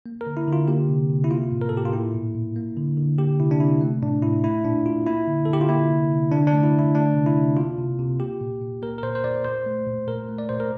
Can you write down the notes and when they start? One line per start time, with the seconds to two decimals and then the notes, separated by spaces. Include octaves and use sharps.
0.06 A#3
0.21 A#4
0.27 D3
0.37 E4
0.47 D3
0.53 F4
0.68 A#3 G4
0.89 C3
1.10 C3
1.24 E4
1.30 A#3 F4
1.52 A2
1.61 A#4
1.69 A4
1.73 A2 G4
1.85 F4
1.93 A#3 E4
2.14 A#2
2.35 A#2
2.56 A#3
2.77 D3
2.97 D3
3.18 A#3 G4
3.39 C3 E4
3.51 D4
3.60 C3 E4
3.81 A3
4.02 A2 D4
4.23 A2 E4
4.44 A3 E4
4.65 A#2 D4
4.86 A#2 F4
5.07 A#3 E4
5.27 D3
5.45 D3 A4
5.53 G4
5.61 F4
5.69 A#3 E4
5.90 C3
6.11 C3
6.32 D3 D4
6.47 D4
6.53 A3
6.64 E4
6.73 D3
6.79 E4
6.95 A3 D4
7.15 C3
7.26 E4
7.37 C3
7.57 A#3 F4
7.78 C3
7.99 C3
8.20 A#3 G4
8.41 A#2
8.62 A#2
8.82 A#3 A#4
8.98 A#4
9.03 A#2 C5
9.15 C5
9.24 A#2 D5
9.44 A#2 C5
9.66 A3
9.87 A#2
10.07 A#2 A#4
10.29 A3
10.38 D5
10.49 A#2 C5
10.60 A#4